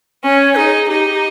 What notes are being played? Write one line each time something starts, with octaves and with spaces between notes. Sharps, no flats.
C#4 C#5
D#4 G#4
D#4 G4